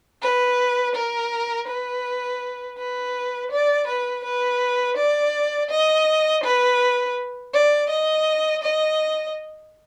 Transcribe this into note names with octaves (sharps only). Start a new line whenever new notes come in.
B4
A#4
B4
B4
D5
B4
B4
D5
D#5
B4
D5
D#5
D#5